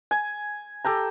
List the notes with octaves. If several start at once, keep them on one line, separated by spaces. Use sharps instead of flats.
G#5
G4 A4 G5 A#5